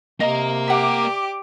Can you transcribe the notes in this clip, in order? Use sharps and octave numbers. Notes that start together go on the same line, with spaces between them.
C3 A#3 A#4 D#5
G4 E5 F#5 D6
D5